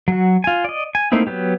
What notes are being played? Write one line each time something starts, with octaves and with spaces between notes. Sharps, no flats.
F#3 F#4
F4 G#5
D5 D#5
G#5
A3 A#3 C4 D#4 E4
F#3 B3 G4